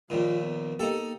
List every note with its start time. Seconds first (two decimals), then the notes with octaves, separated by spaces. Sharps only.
0.10 A#1 D#2 A#2 F4
0.46 B3
0.79 A#3 D#4 G4 A4